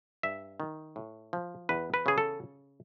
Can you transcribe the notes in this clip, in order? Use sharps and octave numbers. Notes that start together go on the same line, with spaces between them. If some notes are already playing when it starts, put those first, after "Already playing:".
G2 E5
D#3
A2
F3
E2 B4
B4
C#3 G#4
A4